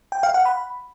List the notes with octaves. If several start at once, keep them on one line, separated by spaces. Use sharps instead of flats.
G5
F5
F#5
B5